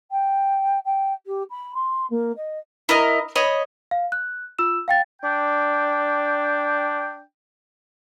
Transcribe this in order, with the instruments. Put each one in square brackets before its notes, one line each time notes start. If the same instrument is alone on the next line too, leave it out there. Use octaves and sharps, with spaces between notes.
[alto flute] G5
G5
G4
B5
C6
A#3
D#5
[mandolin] E4 A#4 D#5
C#5 D#5 B5
[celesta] F5
F#6
F4 E6 E7
F5 G5 A6
[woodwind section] D4 G5